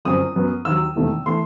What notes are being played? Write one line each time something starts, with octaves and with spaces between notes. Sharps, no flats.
G1 F#2 F#3 C4 D#6
F#2 F#3 B3
D#2 D#3 F#3 E6
E1 E2 C3 D#3 A3
E3 A3 C6